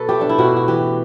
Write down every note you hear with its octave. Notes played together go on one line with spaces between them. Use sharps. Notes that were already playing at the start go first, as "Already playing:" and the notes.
Already playing: B2 A4 B4
A3 G4
D4
E4
B2 F#4
F#4
E3 G4